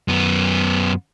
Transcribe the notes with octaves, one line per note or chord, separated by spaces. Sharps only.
F#2 B3